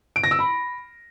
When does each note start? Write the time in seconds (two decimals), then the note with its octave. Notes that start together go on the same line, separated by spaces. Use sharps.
0.16 D7
0.24 A#6
0.31 E6
0.39 B5